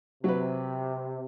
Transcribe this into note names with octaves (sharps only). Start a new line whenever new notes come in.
C3 F#3 B4